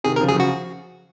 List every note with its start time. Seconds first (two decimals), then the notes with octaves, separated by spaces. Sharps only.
0.04 C3 D#3 G#4
0.16 A#4
0.20 C#3 F3
0.29 F#3 G#4
0.35 C#3 F3 F#4